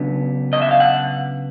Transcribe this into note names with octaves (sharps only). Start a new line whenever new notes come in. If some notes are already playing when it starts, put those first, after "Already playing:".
Already playing: C#3 F#3 B3 D4
D#5
E5
F5
F#5